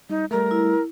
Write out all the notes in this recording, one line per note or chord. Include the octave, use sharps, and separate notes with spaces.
G3 D#4
G3 A3 A#4
E4